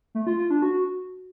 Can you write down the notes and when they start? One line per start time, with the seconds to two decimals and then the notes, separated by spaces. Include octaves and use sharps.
0.15 A3
0.27 F4
0.38 F4
0.50 D4
0.62 F#4